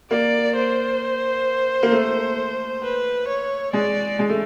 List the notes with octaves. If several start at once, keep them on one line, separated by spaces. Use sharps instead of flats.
A#3 D5
C5
A#3
A3
B4
C#5
G#3 D5
G#3
A3